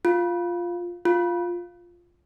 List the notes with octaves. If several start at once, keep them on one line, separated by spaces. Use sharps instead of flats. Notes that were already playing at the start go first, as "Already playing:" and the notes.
F4
F4